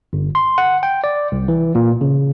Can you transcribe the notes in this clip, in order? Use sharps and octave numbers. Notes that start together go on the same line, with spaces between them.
G1
C6
F#5
G5
D5
C2
E3
A#2
C#3